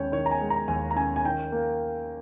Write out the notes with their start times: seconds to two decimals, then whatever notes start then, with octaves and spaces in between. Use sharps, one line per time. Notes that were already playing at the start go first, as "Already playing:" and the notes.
Already playing: D#2 G#3 C#4 C#5 G5
0.12 D#3 C#5
0.26 A#5
0.31 G#5
0.41 G#3
0.50 A#5
0.68 D#2 G#5
0.91 A#5
0.96 C#4 G#5
1.16 G#5
1.25 D#3 G5
1.52 A#3